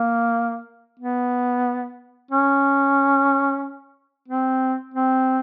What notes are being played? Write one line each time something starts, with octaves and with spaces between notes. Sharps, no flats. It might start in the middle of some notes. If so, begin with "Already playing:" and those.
Already playing: A#3
B3
C#4
C4
C4